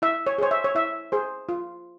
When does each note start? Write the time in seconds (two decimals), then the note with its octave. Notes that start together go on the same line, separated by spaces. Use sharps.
0.02 E4 E5
0.27 C#5
0.38 G#4 C5 C#5
0.51 E5
0.64 C#5
0.75 E4 E5
1.12 G#4 C5
1.49 F4